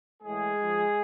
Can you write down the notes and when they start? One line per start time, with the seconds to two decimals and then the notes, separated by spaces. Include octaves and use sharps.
0.23 A2 E3 G#3 G#4
0.57 G#2 F3